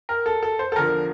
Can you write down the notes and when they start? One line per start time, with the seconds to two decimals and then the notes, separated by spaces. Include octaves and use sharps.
0.09 A#4
0.26 A4
0.43 A4
0.59 C5
0.72 A4
0.76 E2 D3 F3 A#4